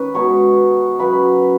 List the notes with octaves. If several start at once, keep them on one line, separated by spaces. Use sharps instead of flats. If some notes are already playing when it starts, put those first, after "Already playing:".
Already playing: D#3 C#4 B4 B5
B2 G#3 B3 D#4 C#5 C#6
F#2 C#3 F#3 B3 B4 B5